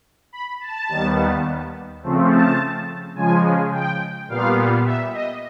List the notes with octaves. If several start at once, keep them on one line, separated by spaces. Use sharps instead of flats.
B5
A5
D#2 D#3 G3 B3
C#3 F3 A3 C4
A5
C#3 F3 G#3 G#5
G5
A#2 G3 B3 F5
E5
D#5